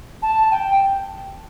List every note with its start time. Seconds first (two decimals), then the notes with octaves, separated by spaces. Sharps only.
0.22 A5
0.51 G5